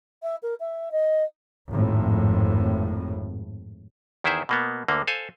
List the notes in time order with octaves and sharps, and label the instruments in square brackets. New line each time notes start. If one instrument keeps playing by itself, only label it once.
[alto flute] E5
A#4
E5
D#5
[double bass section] G#1 F2 A2
[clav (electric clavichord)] E2 D#3 E4 G#4 C5 E5
B2 A#3 B3
D2 D3 A#3
A4 C5 F5 G#5